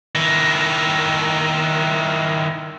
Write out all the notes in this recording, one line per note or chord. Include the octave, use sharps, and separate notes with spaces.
D#3 E4